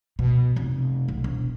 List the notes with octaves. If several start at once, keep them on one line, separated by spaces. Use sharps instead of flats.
B2
F1
B1
E1